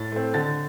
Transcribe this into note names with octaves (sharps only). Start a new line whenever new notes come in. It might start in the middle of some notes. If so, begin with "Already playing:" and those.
Already playing: A2 A6
A3 C4
D3 A6